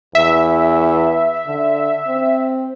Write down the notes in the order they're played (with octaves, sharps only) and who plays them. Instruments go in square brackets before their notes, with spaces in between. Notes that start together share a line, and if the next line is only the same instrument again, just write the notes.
[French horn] E2 [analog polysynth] E5
[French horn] D3
C4